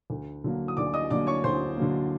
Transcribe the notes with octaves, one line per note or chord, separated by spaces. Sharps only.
D2
D3 F#3 A#3
D#6
D2 D5 D6
D#5 D#6
D3 F#3 A#3 D5 D6
C#5 C#6
D2 C5 C6
D3 F#3 A#3